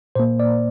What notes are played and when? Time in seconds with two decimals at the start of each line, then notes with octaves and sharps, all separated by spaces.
0.15 A#2 A#3 C5
0.40 D5